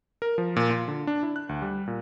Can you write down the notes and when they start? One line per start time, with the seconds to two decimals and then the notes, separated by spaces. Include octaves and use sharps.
0.22 A#4
0.38 F3
0.56 A#2
0.71 F4
0.88 D3
1.07 D4
1.23 E4
1.36 F#6
1.49 D2
1.62 G3
1.87 A#2